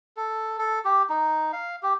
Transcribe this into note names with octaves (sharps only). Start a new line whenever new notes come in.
A4
A4
G4
D#4
F5
G4